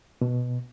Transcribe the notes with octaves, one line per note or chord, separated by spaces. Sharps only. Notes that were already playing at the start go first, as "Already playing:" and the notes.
B2